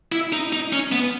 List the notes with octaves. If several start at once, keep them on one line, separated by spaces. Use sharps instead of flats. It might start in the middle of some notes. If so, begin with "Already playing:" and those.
E4
D#4
D#4
C#4
B3